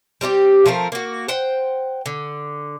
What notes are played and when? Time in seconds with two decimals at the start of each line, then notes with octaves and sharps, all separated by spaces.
0.21 G3 C4 D#4 G4
0.66 F3 A3 C4 A#4
0.92 A#3 F#4
1.29 C5 F#5 G5
2.06 D3